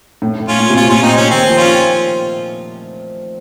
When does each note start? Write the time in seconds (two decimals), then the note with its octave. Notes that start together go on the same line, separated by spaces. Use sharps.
0.22 A2
0.40 A2
0.48 C#4 F4
0.58 A#2
0.70 C3
0.76 A#2 C#4 F4
0.89 A#2 C#4 F4
1.03 A#2 C4 D#4
1.16 C3 C#4
1.30 D#3 C4
1.49 F3
1.57 C#4 F4